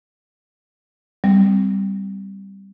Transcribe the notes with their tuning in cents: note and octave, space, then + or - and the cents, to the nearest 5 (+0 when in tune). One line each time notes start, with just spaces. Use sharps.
G3 +0 C4 -20